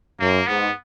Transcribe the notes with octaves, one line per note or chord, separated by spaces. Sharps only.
F#2 A#3
G#2 B3